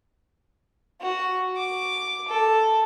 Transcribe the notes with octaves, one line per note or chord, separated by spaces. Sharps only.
F#4
D6
A4